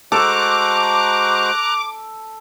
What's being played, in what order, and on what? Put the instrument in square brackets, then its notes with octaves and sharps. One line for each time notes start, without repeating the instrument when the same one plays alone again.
[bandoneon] G#3 F#4 C5 [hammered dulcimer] A4 [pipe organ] A#5 F#6 [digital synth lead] D6